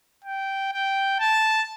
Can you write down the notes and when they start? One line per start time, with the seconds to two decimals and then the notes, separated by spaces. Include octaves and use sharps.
0.24 G5
0.72 G5
1.20 A5